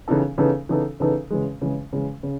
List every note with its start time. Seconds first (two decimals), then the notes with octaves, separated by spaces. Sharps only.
0.08 C#3 E3 B3 D#4 A4
0.38 C#3 E3 B3 D#4 A4
0.69 C#3 E3 B3 D#4 A4
1.00 C#3 E3 B3 D#4 A4
1.30 C#3 E3 G#3
1.61 C#3 E3 G#3
1.93 C#3 E3 G#3
2.23 C#3